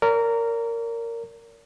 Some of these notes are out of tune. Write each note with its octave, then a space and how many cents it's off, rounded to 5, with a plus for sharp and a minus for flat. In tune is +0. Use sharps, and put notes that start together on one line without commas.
A#4 -15 D5 -45